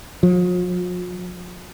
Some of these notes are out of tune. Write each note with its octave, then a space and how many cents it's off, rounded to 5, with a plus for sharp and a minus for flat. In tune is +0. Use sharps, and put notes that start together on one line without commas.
F3 +45